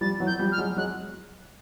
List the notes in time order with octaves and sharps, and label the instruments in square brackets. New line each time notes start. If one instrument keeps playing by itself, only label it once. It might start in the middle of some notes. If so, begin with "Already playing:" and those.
[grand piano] F3 G3 [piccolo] A6
[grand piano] E3 F#3
[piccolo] G6
[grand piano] F3 G3
[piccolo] F6
[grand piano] F#3 G#3
[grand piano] F#3 G#3 [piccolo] F#6